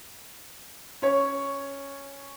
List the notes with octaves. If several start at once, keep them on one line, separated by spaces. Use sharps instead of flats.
C#4 C#5 C#6